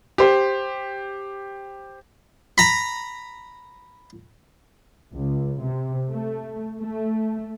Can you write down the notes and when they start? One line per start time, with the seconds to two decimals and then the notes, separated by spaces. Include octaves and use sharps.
0.18 G4 C5
2.58 A#5 B5
5.13 C#2
5.62 C3
6.11 A3
6.80 A3